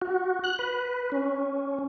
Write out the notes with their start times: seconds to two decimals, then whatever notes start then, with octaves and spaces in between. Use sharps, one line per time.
0.02 F#4
0.44 F#6
0.59 B4
1.12 C#4